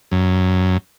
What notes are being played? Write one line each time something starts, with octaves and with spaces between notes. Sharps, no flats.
F#2